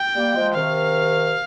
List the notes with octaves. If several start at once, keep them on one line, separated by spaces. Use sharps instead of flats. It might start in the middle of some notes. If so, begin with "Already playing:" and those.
Already playing: G5
G3 A#3
F3 G#3
C3 D#3 F5